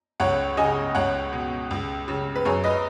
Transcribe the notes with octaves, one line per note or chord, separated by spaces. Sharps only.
C#2 C#5 F#5
C#3 D#5 G#5
C#2 C#5 F#5
B2
C#2
C#3
B4
F#2 G#4 C#5
B4 D#5